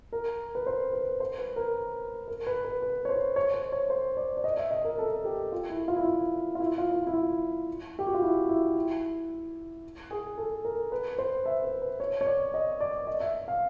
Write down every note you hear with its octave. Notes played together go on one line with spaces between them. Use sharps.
A#4
B4
C5
B4
C5
B4
A#4
A#4
B4
B4
B4
C#5
C5
C#5
C5
C#5
C5
D5
D5
D#5
E5
D#5
A#4
A4
G4
F4
E4
F4
E4
F4
F4
E4
F4
E4
E4
F4
G4
F#4
F4
E4
E4
G#4
A4
A#4
B4
C5
E5
B4
B4
C#5
C#5
D5
D#5
D5
D#5
E5
F5